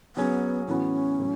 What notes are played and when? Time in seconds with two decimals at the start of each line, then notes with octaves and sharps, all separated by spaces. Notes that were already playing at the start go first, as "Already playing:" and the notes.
0.16 F#3 B3 C#4 G#4
0.67 A2 E3 B3 C#4 F#4
1.19 A2 F#3